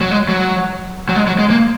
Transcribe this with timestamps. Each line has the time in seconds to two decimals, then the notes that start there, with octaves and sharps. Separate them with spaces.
0.01 F#3
0.11 G#3
0.29 F#3
1.09 F#3
1.16 G#3
1.27 F#3
1.39 G#3
1.50 A#3